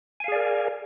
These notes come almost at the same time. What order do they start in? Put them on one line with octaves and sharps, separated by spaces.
G#5 F5 G#4 D5 A#4